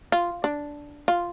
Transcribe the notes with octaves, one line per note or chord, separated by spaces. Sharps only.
F4
D4
F4